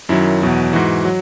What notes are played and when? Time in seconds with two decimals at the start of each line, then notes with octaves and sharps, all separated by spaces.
0.09 F#2 D#3 F#3 E4
0.42 E2 B2 F#3
0.73 G#2 E3 F#4
1.05 F#3